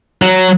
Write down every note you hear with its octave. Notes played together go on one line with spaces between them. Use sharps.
F#3